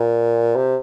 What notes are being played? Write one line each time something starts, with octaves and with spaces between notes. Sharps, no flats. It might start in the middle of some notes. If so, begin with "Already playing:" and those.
Already playing: A#2
C3